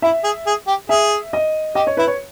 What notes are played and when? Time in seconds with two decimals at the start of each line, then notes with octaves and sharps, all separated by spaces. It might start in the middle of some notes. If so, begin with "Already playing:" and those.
0.02 E4 E5
0.24 G#4
0.47 G#4
0.67 G4
0.89 G#4 E5
1.33 D#5
1.75 G4 D#5
1.87 C#5
1.97 E4 B4
2.07 C#5